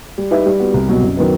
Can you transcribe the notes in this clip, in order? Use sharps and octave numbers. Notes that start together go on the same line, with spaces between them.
G3
D#4 G4 B4 E5
G3
B3 F#4
C2
B2 F#3
F#2
D#3 F#3 B3